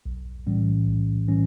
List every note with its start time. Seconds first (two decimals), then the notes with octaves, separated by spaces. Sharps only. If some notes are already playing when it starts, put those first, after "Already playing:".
0.06 B1
0.47 A2 E3 G3 C#4
0.87 B1
1.28 A2 E3 G3 C#4